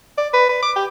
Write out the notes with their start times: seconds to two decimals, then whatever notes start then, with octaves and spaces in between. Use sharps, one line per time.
0.18 D5
0.34 B4
0.49 B4
0.62 D6
0.76 G4